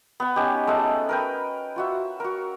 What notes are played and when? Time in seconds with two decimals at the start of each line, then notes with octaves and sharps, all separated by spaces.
0.20 B3 F#5
0.36 B3 C#4 D#4 G4
0.67 G#3 A3 A4 F#5
1.09 A#4 B4 G5
1.76 F4 F#4 E5
2.20 F#4 A#4